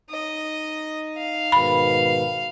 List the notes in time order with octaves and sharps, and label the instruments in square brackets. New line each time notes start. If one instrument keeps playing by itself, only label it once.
[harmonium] D#4 [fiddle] D#5
[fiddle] F5
[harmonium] G#2 B2 D#3 [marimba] B5